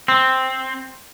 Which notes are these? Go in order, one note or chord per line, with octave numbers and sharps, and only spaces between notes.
C4